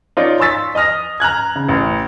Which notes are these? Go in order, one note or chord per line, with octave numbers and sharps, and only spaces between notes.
D#4 F4 C#5 D5
C6 C#6 E6 A6 B6
D#5 D#6 F6 A#6
A#5 F6 F#6 G#6
C#3
A1